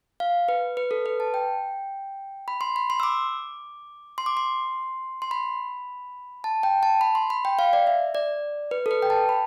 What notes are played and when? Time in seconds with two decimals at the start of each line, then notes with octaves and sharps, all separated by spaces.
0.20 F5
0.48 B4
0.77 B4
0.91 A4
1.06 B4
1.20 A5
1.34 G5
2.48 B5
2.61 C6
2.76 B5
2.90 C6
3.00 E6
3.03 D6
4.18 C6
4.26 D6
4.37 C6
5.22 C6
5.31 B5
6.44 A5
6.63 G5
6.83 A5
7.01 B5
7.15 C6
7.30 B5
7.45 G5
7.59 F5
7.73 D5
7.87 E5
8.15 D5
8.71 B4
8.86 A4
8.91 B4
9.02 G5
9.10 A5
9.29 B5